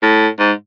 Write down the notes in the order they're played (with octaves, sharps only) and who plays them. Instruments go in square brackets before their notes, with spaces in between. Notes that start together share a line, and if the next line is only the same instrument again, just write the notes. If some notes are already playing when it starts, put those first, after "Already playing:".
[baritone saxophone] A2
G#2